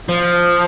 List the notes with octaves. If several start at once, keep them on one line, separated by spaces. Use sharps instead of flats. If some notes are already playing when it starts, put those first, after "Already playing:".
F3